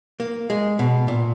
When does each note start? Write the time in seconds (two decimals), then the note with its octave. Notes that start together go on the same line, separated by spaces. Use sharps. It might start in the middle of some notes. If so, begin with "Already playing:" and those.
0.20 A#3
0.50 G#3
0.79 B2
1.08 A#2